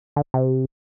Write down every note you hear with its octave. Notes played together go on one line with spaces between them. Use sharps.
D3
C3